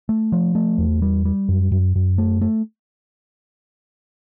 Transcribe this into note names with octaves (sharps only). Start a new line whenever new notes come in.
A3
F3
A3
E2
G3
G3
F#2
F#2
F#2
A3
A3